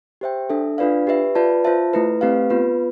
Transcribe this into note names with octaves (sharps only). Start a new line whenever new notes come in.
G4 C5 E5 G5
D4 A4 E5
D4 F4 B4 D5 F5
G4 B4 E5
F4 B4 D5 A5
F4 C5 E5 A5
A3 E4 B4
A3 C4 G4 B4 F5
B3 F4 B4